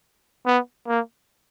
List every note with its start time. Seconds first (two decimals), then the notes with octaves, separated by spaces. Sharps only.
0.46 B3
0.88 A#3